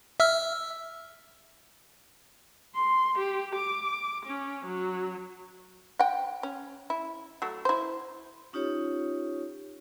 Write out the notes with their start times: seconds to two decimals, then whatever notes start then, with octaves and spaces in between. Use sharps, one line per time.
0.20 E5 E6 F6
2.75 C6
3.19 G4
3.55 D6
4.26 C#4
4.66 F#3
5.99 F#5 G5
6.43 C#4
6.90 E4
7.42 F#3 A3
7.65 E4 C5
8.53 C#4 D#4 F4 G4 C#5